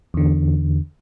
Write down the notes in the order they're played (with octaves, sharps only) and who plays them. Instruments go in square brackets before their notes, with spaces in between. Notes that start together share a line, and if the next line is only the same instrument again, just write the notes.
[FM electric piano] E2 D3